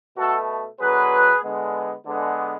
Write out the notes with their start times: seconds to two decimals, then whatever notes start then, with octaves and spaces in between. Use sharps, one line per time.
0.17 B2 A3 F#4 A4
0.80 D3 F#3 B3 G#4 B4
1.43 D3 G#3 B3
2.06 D3 G#3 B3